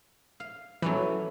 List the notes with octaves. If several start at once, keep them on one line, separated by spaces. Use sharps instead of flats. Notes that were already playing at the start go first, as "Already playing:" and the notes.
F5
E3 F#3 A3 C#4 E4